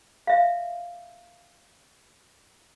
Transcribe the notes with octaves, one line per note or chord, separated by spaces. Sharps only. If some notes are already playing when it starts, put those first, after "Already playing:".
E5 F5